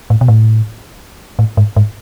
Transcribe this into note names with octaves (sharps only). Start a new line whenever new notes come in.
A2
B2
A2
A2
G#2
G#2